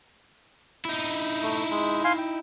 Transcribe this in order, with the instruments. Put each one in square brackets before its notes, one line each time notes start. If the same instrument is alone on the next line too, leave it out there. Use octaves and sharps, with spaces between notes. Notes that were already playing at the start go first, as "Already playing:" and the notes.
[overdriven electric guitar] D#4 E4
[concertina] A3
G#3
F5 G#5 C6
G5